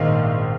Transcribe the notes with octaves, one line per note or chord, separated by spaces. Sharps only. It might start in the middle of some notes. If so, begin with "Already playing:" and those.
Already playing: A#1 G#2 D#3 A#3 D#4 F5